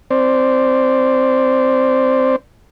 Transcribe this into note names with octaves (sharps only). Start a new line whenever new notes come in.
C4 C5 D5